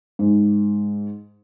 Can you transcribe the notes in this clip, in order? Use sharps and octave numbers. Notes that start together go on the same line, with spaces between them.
G#2